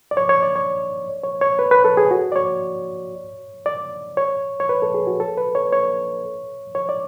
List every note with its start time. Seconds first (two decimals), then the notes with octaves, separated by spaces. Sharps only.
0.11 D5
0.17 C#5
0.29 C#5
0.43 D5
0.56 C#5
1.24 C#5
1.41 C#5
1.59 B4
1.71 B4
1.84 A4
1.97 G#4
2.11 F#4
2.32 D5
2.36 C#5
3.66 D5
4.17 C#5
4.60 C#5
4.69 B4
4.82 A4
4.94 G#4
5.07 F#4
5.20 A4
5.38 B4
5.55 C#5
5.73 C#5
6.75 C#5
6.89 D5